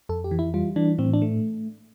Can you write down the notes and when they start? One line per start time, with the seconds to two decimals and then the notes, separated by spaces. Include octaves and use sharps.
0.09 F2 A4
0.24 G4
0.31 E3
0.39 E4
0.54 G3 F4
0.76 E3 D4
0.98 A2 C4
1.14 D4
1.22 A3